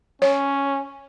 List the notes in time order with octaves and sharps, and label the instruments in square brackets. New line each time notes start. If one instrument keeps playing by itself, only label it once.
[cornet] C#4 [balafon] C#5